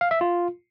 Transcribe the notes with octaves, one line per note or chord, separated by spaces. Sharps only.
F5
E5
F4